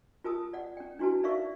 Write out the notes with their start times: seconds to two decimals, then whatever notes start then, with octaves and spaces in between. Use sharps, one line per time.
0.24 F4 A#4 A5 D#6
0.53 D5 F#5
0.77 C#4 G5
0.99 D4 E4 F#4 B4 A5
1.23 D#4 A#4 D5 E5 F5 C#6